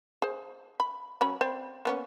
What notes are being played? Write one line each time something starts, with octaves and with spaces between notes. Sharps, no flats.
G#4 C5
B5
F#3 C#4 B5
C4 C5 D5
A#3 B3 C#4